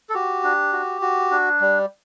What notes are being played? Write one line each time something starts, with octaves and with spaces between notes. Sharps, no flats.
A4
F#4 G4
D4
F#4
F#4
D4
G3